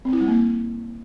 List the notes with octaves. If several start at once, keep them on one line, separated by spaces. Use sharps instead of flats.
C4
E4
G3
A#3